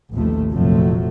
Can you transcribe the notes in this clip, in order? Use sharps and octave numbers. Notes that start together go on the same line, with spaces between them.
A1 D#2 C3 F3 A3
F1 A#1 F2 F3 F#3 A3